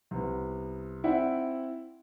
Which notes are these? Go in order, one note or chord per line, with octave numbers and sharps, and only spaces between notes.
C2 B3
C4 E4 D5 E5 F#5